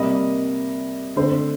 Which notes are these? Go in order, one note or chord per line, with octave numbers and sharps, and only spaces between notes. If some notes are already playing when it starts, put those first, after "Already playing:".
Already playing: C3 G3 A#3 D#5
D3 A3 C4 C5